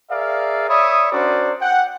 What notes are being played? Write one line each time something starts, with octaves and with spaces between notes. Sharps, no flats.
G#4 A#4 D5 E5 F5
C#5 D5 E5 B5 D#6
C#4 D4 F#4 A#4 C5 D5
F#5 G5